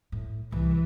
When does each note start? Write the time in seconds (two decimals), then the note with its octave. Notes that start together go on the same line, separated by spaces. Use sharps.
0.12 A2
0.52 C2 E3